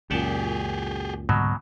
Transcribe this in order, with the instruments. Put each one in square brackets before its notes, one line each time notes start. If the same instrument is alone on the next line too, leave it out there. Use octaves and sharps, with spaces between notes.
[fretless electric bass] C#2 F#2 A#2 [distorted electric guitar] G4 G#4 [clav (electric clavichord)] D5 F#5 A5
[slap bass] G#2 D3 G3 [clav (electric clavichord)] B2 F#3